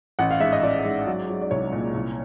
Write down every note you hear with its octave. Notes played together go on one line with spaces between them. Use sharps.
A1 F#5
F5
G#2 E5
D#5
A1 D5
G#2
F#3
F#3
D5
C2 C#5
A#2
C2